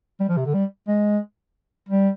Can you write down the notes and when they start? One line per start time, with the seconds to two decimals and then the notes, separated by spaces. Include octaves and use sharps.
0.20 G3
0.29 F3
0.37 C3
0.46 D3
0.54 G3
0.88 G#3
1.89 G3